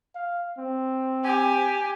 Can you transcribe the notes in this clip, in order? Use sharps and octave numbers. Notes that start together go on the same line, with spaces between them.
F5
C4
G4 G#5